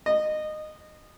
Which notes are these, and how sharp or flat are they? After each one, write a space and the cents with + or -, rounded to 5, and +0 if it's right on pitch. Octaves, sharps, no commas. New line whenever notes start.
D#5 -20